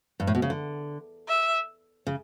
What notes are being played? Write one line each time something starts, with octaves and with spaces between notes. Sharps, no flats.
G2
A2
B2
C#3
D3
E5
C#3